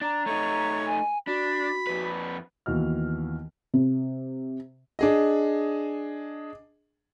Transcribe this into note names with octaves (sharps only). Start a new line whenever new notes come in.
D4 A#5
A3 D#4 C#5
G#5
D4 F#4 B5
F2 B4
D#2 E3 B3 F#4 D#5 F6
C3
D4 G#4 D#5